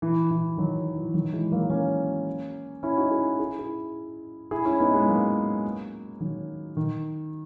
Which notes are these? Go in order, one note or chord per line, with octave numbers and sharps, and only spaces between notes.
E3
E3
D#3 F#3
E3
D#3 F#3
E3 G#3
F#3 A#3
A#3 C#4
C#4 E4
D#4 F#4
E4 G#4
E4 G#4
E4 G#4
E4 G#4
C#4 E4
B3 D#4
G#3 B3
F#3 A#3
D#3 F#3
D#3